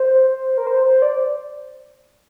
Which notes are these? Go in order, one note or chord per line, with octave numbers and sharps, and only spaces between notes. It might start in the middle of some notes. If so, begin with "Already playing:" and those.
Already playing: C5
A#4
C5
C5
D5